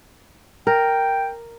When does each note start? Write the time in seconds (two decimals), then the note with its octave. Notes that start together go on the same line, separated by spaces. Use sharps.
0.67 A#4 G5